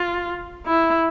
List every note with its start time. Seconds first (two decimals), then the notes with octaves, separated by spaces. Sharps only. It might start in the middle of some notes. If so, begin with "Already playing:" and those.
Already playing: F4
0.66 E4